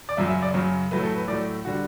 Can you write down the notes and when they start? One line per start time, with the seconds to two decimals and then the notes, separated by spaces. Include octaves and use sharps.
0.09 D5
0.17 F#2 C#3 F#3 E5
0.30 E5
0.42 D5
0.54 F#2 C#3 F#3 C#5
0.91 A2 F#3 A3 B4
1.04 A4
1.15 B4
1.28 A2 F#3 A3 D5
1.65 D3 G3 F#4